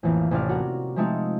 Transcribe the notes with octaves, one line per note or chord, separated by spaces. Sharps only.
A1 F2 E3 A#3
A1 C3 C#4 D5 F6
F#4 A#4
F3 G#3 A3 C4 D#4 F4